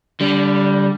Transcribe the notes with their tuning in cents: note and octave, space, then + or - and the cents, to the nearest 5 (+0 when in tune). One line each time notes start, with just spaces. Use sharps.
D3 -30 G3 +0